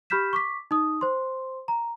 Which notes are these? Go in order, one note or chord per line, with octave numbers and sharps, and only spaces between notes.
G4 B5 F6 G6 B6 E7
C#6 D6 B6
D#4 D#6
C5 C6
A#5